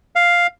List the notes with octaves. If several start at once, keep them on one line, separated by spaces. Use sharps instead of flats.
F5